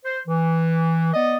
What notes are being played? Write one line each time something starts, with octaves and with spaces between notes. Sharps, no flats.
C5
E3
B3 D5 D#5